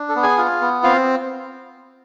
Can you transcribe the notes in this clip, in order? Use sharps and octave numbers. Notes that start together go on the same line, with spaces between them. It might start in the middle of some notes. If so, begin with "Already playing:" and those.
Already playing: D4
A4
B3
G#4 G#5
F4
B3
C4 F4 F5